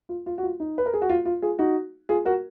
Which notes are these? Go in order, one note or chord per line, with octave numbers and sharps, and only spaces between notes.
F4
F4
F#4
F4
D#4
B4
A#4
G#4
F#4
F4
F4
F4 G#4
D#4 F#4
F4 G#4
F#4 A#4